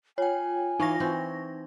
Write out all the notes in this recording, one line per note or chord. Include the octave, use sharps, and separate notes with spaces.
F4 C#5 G5 G#5
E3 D#4 D#5 F5 C#6 A#6
E3 C4